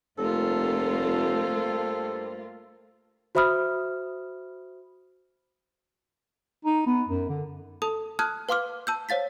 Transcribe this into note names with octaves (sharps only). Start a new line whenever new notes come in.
F1 G2 A3 A#3 F4 A4 C5
F#4 C5 E5 B5 D#6 F6
D#4
B3
F#2
D3
A4 A5 D#6
A5 D#6 F6 F#6 G#6
B4 F5 C6 D6 F6
A5 E6 G6
C5 C#5 F5 A6 B6